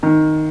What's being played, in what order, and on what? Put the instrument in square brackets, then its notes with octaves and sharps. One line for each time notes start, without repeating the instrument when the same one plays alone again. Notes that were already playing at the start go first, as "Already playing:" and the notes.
[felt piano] D#3